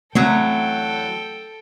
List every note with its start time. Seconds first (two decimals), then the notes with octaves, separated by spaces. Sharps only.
0.15 E2 F#3 A3 C4 C#4 A4 C#5 G5